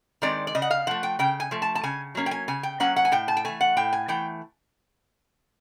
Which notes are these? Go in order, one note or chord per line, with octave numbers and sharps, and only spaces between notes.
D#3 G#3 C4 D5
D5
C#3 D#5
F#5
F5
F3 A3 F#5
G5
C#3 G5
G#5
F3 A3
A5
A5
C#3 G#5
F#3 A#3 C#4
G5
G#5
C#3 G#5
G5
F#3 A#3 C#4 F#5
F#5
G#5
A2 G5
A5
G5
E3 A3 G#5
F#5
A2 G5
G#5
E3 A3 G5